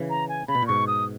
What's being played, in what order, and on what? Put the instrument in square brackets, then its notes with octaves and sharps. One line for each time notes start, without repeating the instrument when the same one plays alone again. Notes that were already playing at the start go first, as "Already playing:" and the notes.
Already playing: [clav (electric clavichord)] C#3 E3
[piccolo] A#5
G#5
[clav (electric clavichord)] C#3 [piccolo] B5
[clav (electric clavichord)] B2
A#2
[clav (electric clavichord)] G#2 B2 [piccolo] C#6
[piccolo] D#6